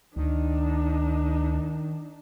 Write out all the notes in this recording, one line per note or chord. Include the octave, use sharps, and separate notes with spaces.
D2 D#3 D4 D#4